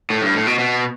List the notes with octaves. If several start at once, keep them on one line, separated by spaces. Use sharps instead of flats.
A2
G2
A2
B2
B2